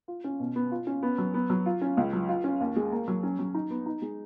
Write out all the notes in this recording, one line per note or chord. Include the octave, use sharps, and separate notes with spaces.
F4
C#4
B2
B3
F4
C#4
B3
F#3
B3
F#3
F4
C#4
C#2
F#3
F4
C#4
D#2
G#3
A#3
F#3
C#4
F#3
D#4
B3
D#4
G#3